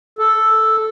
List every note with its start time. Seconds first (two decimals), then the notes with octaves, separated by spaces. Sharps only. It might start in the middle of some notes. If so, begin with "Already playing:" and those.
0.19 A4